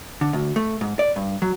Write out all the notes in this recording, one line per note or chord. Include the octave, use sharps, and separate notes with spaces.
D3
D2
A3
G#2
D5
G2
F#3